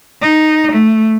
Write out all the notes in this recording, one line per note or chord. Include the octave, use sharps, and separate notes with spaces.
D#4
A3